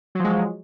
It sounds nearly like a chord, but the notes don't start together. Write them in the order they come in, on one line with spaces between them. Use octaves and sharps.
F#3 F3 G#3